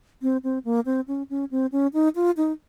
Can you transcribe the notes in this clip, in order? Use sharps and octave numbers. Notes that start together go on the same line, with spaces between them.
C4
C4
A#3
C4
C#4
C#4
C4
C#4
D#4
F4
D#4